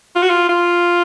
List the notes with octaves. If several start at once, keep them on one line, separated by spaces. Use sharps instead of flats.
F4
F#4
F4
F4